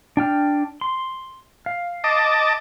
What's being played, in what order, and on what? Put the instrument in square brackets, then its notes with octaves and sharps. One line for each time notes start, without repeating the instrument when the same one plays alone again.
[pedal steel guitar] D4 G5 F6
C6
F5
[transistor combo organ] D#5 A5 D6